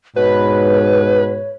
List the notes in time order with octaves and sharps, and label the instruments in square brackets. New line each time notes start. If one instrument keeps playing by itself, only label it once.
[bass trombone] G#2 [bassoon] B2 [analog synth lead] B4 [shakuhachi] C#5